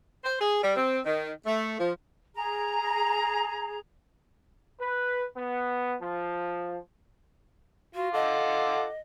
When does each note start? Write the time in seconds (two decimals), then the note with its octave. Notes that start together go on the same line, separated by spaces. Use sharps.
0.24 C5
0.40 G#4
0.62 G3
0.75 C4
1.04 D#3
1.45 A3
1.79 F3
2.35 G#4 A#5
4.79 B4
5.36 B3
6.00 F3
7.95 F4 F#4
8.14 A4 D#5 F#5 D6